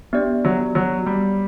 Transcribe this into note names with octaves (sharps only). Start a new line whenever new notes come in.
B3 D4 G4 D5
F#3
F#3
G3